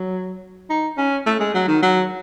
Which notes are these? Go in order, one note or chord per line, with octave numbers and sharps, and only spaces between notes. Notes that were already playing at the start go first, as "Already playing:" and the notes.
Already playing: F#3
D#4
C#4
A3
G#3
F#3
D#3
F#3